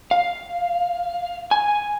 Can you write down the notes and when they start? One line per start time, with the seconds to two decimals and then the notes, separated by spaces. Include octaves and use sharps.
0.11 F5
1.51 G#5